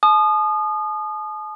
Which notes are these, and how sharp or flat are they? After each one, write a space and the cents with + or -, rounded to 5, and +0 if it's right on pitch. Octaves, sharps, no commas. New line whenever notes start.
A5 -45 D#6 -30